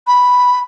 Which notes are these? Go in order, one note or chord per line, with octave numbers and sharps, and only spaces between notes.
B5